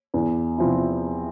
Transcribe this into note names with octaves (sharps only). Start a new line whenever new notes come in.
E2
C3 F3 C4 E4